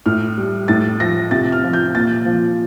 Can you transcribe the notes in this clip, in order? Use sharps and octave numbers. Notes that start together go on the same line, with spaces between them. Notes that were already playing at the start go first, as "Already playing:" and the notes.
A2 F6
G3
A2 A6
F3 A#6
C3 A6
F6
F3
G6
A#2 A6
F3